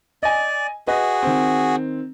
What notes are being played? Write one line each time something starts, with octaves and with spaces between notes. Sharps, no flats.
D5 D#5 G#5
F#4 G#4 B4 D#5
D#3 C4